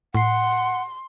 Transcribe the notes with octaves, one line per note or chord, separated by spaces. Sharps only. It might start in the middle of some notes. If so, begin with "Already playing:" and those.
A2 F#5 C6 C7